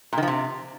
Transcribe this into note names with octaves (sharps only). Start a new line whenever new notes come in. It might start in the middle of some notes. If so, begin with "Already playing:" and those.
A#2
D#3
F3
C3